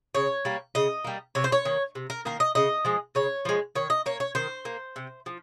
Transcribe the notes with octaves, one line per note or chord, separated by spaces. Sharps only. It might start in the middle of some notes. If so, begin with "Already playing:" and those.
C#3 C#5
G3 A#3
C#3 D#5
G3 A#3
C3 C#5
C5
C#5
D#3 A#3
C3
A#4
D#3 A#3 A#4
D#5
C#3 D#5
F3 G#3
C#3 C#5
F3 G#3
D#3 C#5
D#5
A#3 C#5
C#5
D#3 C5
A#3
C3
F3